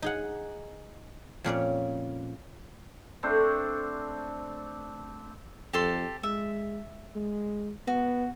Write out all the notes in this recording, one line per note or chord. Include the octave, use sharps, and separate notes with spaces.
D#4 G#4 F#5
F2 A#2 C#4 D5
A3 C4 D4 C5
F2 G4 A4 C6
G#3 E5
G#3
B3 F#4